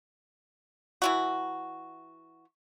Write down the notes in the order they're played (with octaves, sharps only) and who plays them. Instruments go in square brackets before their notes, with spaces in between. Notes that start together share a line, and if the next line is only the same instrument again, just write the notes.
[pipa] E3 E4 F#4